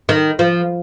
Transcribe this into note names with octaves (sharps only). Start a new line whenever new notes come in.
D#3
F3